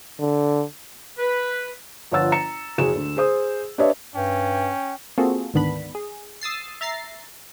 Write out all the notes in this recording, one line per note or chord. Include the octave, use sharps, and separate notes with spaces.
D3
B4
G1 F3 C#5 F#5 E6 A6
A#5 C#7 E7
F#1 F#4 G#4 E7
D2
G#4 C5 D#6
D4 G4 B4 C#5 D#5 E5
G2 C#4 G5
A#3 C4 F4 F#4 G#4 A4
D2 G#2 D#3 B3 D4 B5
G#4
D#6 E6 A6 C7
E5 A#5 A6 C7